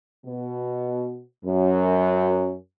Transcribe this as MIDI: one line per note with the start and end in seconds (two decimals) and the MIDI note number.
0.25 1.24 47
1.45 2.56 42